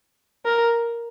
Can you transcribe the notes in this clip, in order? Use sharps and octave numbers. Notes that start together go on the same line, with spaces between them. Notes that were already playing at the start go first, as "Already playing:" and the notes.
A#4